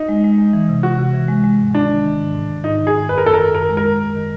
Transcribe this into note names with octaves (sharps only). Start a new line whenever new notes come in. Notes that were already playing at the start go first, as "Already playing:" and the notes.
Already playing: D#4
G#3
G#3
G#3
E3
C3
C3 F#4
C3
E3
G#3
G#3
G#2
D#3 D4
G#3
D#3
G#2
G#2
G#2
G#2 D#4
D#3
G#4
G#2
F#2 B4
A#4
F#2 A4
A#4
D#3
F#2 A#4
G#3
A#4
G#3
F#2
D#3